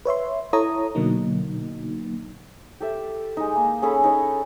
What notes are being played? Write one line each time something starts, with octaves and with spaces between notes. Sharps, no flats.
B4 C#5 E5 C6
E4 A4 C#5 A#5 D#6
B2 D3 F#3 A#3 D#4
G4 A4 E5
G#3 D#4
A#3
C#4 G#4 A4 B5
D#4 C#5